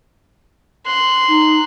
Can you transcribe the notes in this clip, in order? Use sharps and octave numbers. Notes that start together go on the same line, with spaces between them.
C6 F#6
D#4